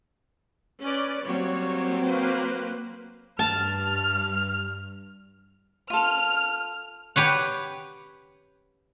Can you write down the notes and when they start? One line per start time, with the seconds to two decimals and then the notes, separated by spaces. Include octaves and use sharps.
0.81 C#4 B4 D5
1.26 F#3 G3 A#3 C4 C#5
2.05 A#3 B4 C5
3.39 G2 A5 F6
5.90 F4 A4 F6
7.16 G4 B4 C#5 F#5